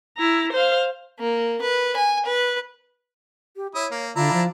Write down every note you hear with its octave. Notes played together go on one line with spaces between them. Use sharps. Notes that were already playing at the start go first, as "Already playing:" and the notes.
E4 A#5
C5 F5
A#3
B4
G#5
B4
G4
E4 C#5 D#6
A#3
D3 D4 E4 F4 A#5
F3